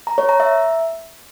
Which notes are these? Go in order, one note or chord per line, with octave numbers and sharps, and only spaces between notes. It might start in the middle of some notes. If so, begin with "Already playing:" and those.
A#5
C#5
A#5
E5